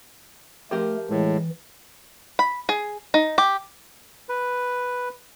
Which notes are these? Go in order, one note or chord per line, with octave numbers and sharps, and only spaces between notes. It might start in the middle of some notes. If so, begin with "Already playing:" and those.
F3 A3 G4 A#4
A2 E3 G#3
B5
G#4
D#4
G4
B4